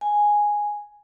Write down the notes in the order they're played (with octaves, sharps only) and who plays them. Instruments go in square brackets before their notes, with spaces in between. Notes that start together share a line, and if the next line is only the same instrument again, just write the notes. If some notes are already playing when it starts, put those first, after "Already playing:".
[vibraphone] G#5